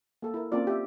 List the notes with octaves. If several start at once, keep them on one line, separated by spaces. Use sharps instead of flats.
A#3 A4
E4 A#4
A#3 C4 C#4 F4 D5
G4 E5